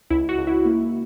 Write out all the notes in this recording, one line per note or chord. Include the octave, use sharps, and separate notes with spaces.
C#2 E4
F#4
C#2
E4
A#3